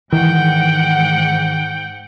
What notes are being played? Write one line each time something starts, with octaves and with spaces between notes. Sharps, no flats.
G#2 D#3 E3 F#5 G5